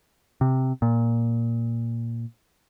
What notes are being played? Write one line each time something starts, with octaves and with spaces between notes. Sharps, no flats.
C3
A#2